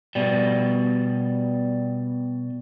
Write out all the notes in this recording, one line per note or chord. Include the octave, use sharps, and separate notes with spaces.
B2 G3